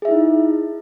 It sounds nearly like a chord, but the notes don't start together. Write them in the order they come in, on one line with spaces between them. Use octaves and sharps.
G#4 E5 E4 D#4